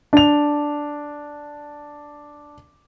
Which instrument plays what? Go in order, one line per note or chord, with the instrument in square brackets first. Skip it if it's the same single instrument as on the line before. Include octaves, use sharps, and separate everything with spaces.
[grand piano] D4 F7